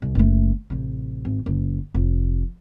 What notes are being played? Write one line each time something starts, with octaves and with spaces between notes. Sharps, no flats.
C2
F#1 A3
A1 C3
G#1
F#1
F1